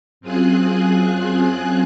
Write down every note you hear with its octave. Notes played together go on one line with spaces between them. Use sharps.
F#2 C4 F4 G#4 G#5 F#6